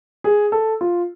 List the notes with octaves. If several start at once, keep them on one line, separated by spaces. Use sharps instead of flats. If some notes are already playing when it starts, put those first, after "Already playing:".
G#4
A4
F4